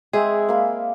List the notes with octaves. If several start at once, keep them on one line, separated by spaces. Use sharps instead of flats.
G#3 C4 G#4 E5
A#3 F5 B5